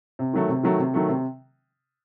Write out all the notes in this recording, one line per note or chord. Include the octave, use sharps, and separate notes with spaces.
C3
D#3 F#3 A3
C3
D#3 F#3 A3
C3
D#3 F#3 A3
C3